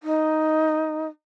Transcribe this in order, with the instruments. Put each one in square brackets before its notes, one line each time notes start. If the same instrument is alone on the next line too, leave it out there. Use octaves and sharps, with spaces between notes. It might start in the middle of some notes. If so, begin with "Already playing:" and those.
[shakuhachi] D#4